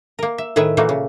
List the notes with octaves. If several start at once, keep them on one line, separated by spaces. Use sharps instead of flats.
A#3 A#4
E5
A2 D#3 G#4 B4 E5
A#2 E3 A3 A#3 F#4
C#3